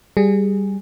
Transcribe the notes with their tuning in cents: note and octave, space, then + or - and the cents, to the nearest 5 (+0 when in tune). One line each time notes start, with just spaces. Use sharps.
G3 +0 G#4 +0